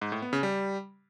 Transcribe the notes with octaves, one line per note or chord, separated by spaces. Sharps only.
G#2
A2
B3
C#3
G3